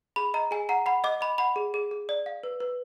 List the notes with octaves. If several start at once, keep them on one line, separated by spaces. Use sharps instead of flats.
G#4 B5
D#5 A#5
G#4 G#5
F#5 A#5
F#5 B5
D#5 D6
D#5 B5
F#5 B5
G#4
G#4
G#4
D5
F5
B4
B4